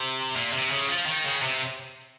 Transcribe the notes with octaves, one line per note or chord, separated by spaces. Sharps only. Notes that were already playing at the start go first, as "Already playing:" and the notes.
Already playing: C3
A#2
C3
C#3
F3
D#3
C#3
C3